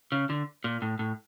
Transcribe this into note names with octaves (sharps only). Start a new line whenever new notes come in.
C#3
D3
A#2
A2
A2